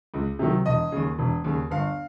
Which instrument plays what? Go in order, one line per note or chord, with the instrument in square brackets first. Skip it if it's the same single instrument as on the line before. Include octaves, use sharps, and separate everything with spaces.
[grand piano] C#2
C3 D#3 F#3
E1 D#5
D#2 C#3
E1
D#2 C#3
G1 F5